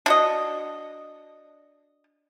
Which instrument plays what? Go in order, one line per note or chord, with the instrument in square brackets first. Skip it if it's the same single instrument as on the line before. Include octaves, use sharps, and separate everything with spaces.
[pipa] D4 F#4 D#5